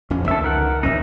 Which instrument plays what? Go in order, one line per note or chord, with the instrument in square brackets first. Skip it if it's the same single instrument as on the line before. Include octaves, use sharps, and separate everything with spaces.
[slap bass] D1 F2 C#4
[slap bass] C#2 D3 D#3 [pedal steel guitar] A4 E5
[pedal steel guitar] A#4 F#5
[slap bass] D#2 E3 C#4 [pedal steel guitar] D#4 E5